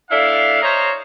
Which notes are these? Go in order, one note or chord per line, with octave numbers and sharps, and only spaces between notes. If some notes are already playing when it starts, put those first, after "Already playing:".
A3 D4 E4 F5
C5 C#5 D#5 F5 A#5